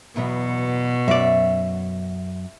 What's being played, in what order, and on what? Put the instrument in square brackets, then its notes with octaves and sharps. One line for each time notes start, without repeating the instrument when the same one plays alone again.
[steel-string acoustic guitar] E2 F#3 B3 [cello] B2
[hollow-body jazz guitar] F#2 D5 [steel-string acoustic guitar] E5